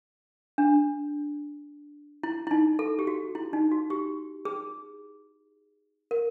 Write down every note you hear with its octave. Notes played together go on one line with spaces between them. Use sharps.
D4
E4
E4
D#4
A4
G4
F#4
E4
D#4
F#4
G4
G#4
A#4